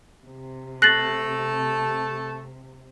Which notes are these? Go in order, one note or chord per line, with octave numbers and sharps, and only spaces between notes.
C3
A3 A4 F#6 A6 A#6 C7 F#7